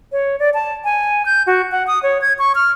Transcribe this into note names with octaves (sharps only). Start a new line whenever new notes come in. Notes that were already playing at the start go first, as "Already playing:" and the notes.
C#5
D5
A5
G#5
G6
F#4
F#5
D#6
C#5
G#6
C#6
F6